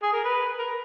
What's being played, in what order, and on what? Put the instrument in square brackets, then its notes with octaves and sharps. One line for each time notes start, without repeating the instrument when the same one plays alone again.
[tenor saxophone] G#4
A#4
B4
A#4